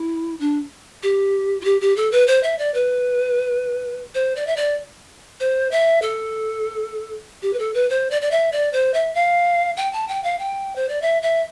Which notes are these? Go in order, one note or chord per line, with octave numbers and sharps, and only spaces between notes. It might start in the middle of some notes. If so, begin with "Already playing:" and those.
Already playing: E4
D4
G4
F4
G4
G4
A4
B4
C5
E5
D5
B4
C5
D5
E5
D5
C5
E5
A4
G4
B4
A4
B4
C5
D5
D5
E5
D5
C5
E5
F5
G5
A5
G5
F5
G5
C5
D5
E5
E5